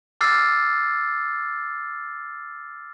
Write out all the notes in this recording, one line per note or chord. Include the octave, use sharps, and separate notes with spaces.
D6 E6 F6 A6 C7